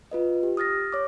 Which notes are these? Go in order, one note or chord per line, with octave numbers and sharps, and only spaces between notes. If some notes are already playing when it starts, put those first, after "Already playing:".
F4 B4 D#5
G4
D#6 F6 A6 A#6
C#5 D6